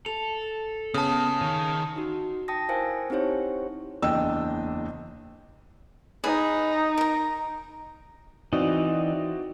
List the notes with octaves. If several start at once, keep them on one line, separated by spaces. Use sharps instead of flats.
A4 F7
C#3 B3 A5 D#6
D#3 C#4
D#4 F#4
G5 A5 D#6 A#6
E4 A#4 C5 F5 G5 G#5
C4 D#4 E4 G4 C5 C#5
F#1 E2 D4 D#5 G5 E6
D#4 G#4 B4
A#4 A#5
E3 C4 D#4 F#4 D5